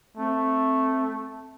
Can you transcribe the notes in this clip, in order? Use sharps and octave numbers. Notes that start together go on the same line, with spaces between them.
A3 C4